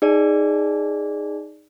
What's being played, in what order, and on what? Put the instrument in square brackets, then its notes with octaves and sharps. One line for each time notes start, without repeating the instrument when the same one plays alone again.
[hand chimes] D#4 G#4 D5